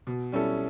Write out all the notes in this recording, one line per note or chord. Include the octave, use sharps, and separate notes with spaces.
B2
G3 C#4 E4 A4